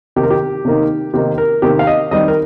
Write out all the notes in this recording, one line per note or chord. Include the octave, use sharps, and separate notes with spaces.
C3 D#3 A#3 D#4 G4
A#4
G4
C3 D#3 A#3 D#4
C3 D#3 A#3 D#4 G4
A#4
C3 D#3 A#3 D#4 G4
F5
D#5
D#3 G3 C4 D#4 D#5
A#4